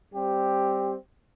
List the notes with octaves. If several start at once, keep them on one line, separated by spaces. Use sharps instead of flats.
G3 C4 G4